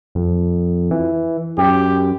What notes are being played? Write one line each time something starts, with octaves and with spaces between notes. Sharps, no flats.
F2
E3
F#2 G4